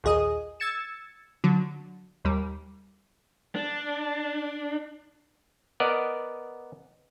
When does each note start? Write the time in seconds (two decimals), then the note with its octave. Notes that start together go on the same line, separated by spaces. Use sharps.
0.04 A#1 D#2 G#4 D#5 D#6
0.60 E6 G#6 A6 C#7 E7
1.44 D3 F#3
2.25 D#2 G3
3.56 D4
5.80 B3 A#4 D5 D#5 F#5